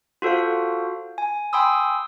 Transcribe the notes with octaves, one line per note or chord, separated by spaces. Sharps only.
F4 F#4 A4 C5 F5
G#5
G5 G#5 B5 C6 D#6 E6